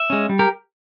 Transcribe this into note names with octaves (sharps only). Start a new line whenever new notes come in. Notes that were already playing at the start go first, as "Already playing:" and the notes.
Already playing: E5
G#3 C#4
G3
G4 A#4